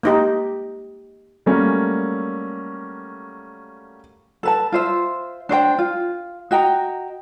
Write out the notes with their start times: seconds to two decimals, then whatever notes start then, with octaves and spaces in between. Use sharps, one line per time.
0.03 A#3 D#4 G4
1.46 F#3 G3 A3 A#3 C#4
4.43 A4 B4 A5
4.72 F4 C5 E5
5.49 D4 C5 C#5 G5
5.79 F4
6.51 F#4 D#5 G5 A#5